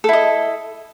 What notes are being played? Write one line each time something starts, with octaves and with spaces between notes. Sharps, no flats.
E4 A4 D#5